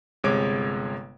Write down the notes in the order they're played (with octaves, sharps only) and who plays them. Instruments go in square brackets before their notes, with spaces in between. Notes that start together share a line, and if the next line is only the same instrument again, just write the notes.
[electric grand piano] G1 C3 G#3 C#5 D6 D7